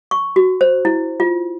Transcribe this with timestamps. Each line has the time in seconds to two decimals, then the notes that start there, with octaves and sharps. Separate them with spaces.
0.11 C#6
0.36 F#4
0.61 C5
0.85 E4
1.20 F4